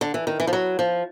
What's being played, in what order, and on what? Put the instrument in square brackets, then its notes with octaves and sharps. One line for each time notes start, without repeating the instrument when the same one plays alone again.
[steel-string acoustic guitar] D3
E3
D#3
E3
F3
F#3
F3